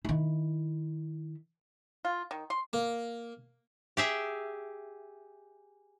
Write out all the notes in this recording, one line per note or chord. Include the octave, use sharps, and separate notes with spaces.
D#3 E4
F4
D#3
C6
A#3
G4 G#4 E5